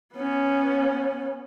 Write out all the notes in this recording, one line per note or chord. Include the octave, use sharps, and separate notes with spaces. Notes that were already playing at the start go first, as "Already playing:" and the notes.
B3 C#4